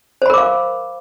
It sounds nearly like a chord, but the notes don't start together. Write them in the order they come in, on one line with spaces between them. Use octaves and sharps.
C5 B5 A#4 D6 F5